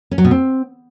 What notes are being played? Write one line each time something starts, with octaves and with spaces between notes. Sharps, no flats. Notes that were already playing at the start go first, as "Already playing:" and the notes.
C#4
F#3
B2
C4